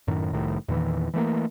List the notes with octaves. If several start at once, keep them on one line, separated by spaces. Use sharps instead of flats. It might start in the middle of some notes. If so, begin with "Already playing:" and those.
F#2 A2 D#3
F1 C2 A2 D#3
E2 A#2 D#3 E3
E3 A3 A#3